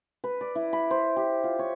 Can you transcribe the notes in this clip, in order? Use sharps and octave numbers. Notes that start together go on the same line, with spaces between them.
B4
D5
E4
B5
C5
G4
F4
C#5